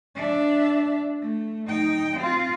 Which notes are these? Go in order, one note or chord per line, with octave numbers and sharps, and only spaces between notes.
D4 E5
A3
D#4 G5
C4 F4